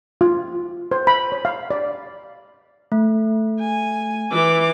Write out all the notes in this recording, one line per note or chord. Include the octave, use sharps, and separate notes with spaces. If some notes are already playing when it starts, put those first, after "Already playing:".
F4
C5
B5
C#5
F5
D5
A3
G#5
E3 D6